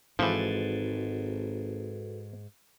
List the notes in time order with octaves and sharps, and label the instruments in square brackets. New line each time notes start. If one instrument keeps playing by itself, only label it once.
[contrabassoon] G#1 [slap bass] G#2 [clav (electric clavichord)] E3 F3 [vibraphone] F#4 A4 B4